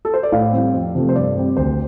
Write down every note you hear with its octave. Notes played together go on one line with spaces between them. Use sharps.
A4
C5
D5
A2 F5
G3 C4
F2
C3 F3 A3
C5
G2 D5
G3 C4
D2 C5